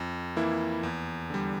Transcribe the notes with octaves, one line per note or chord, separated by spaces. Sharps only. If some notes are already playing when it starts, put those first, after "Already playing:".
Already playing: F2
E3 A#3 E4
E2
D3 G3